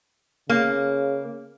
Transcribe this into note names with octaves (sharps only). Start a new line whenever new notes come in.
C#3 A#3